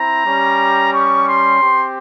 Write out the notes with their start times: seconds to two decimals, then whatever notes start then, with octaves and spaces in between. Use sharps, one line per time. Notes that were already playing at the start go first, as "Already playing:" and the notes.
Already playing: C4 E4 A#5
0.26 G3 C#4 G4
0.93 C#6
1.26 C6
1.61 C4 G4